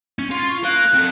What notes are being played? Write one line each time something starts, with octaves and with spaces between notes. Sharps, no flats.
C#4
F4 C6
C#6
A#4 F5 F#6
C4 A4